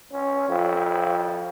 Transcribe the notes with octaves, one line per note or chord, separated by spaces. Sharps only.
C#4
F2